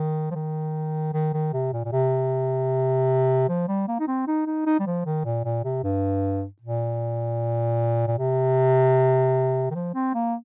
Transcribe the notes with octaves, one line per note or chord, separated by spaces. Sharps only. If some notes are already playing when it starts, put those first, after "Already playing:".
Already playing: D#3
F3
D#3
D#3
D#3
C3
A#2
A#2
C3
F3
G3
A#3
D#4
C4
D#4
D#4
D#4
G3
F3
D#3
A#2
A#2
C3
G2
A#2
A#2
C3
D#3
F3
C4
A#3